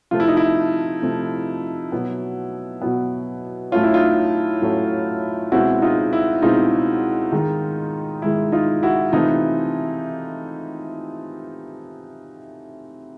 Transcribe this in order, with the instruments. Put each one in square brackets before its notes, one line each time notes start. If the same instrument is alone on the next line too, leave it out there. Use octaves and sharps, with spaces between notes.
[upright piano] C3 F3 A3 C4 F4
E4
D#4
E4
C3 F3 A3 C4
B2 F#3 B3
B2 F#3 B3
A2 F#3 A3 C#4 F4
E4
D#4 F4
A2 F#3 A3 C#4
C#2 B2 G#3 C4 E4 F#4
D#4 F4
E4
C#2 B2 G#3 C4 D#4 F4
G#2 D#3 G#3
G#2 D#3 G#3 E4
D#4 F4
E4 F#4
C3 E3 A3 C4 D#4 F4